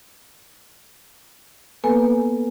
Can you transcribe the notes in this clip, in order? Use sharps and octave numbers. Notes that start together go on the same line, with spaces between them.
A#3 B3 A4 B4 G#5